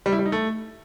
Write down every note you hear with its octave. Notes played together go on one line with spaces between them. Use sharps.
G3
E4
G3
D#4
A3